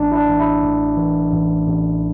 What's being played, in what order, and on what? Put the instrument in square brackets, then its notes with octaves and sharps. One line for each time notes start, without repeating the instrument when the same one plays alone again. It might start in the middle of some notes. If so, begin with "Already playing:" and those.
Already playing: [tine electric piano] A1 D4
E4
D4
A1
E4
A2
E3
A1
A1